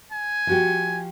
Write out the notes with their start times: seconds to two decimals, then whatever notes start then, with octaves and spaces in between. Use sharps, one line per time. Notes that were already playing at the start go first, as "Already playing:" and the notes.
0.12 G#5
0.47 F3 F#4 G4